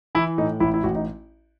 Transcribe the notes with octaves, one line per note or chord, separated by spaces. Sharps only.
E3 E4
A2 D#4
A1 E4
E4
A1 F#4
D#4